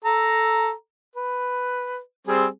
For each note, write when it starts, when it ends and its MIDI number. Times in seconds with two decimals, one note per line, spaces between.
0.05 0.72 69
0.05 0.72 82
1.16 1.99 71
2.28 2.46 55
2.28 2.46 60
2.28 2.46 68